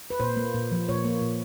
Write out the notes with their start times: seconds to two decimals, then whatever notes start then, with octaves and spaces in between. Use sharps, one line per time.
0.10 B4
0.20 A#2 C5
0.37 A#3
0.55 A#2
0.72 F3
0.89 A#2 C#5
1.04 A#3
1.21 A#2